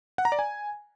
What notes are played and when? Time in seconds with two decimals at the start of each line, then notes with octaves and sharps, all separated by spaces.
0.18 F#5
0.25 A#5
0.32 D5
0.39 G#5